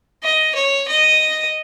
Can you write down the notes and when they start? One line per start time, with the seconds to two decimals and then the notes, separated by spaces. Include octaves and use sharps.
0.23 D#5
0.55 C#5
0.88 D#5